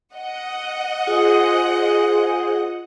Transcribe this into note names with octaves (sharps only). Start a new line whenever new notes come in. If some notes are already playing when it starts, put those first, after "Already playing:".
D#5 F#5
F4 G#4 C5 D#6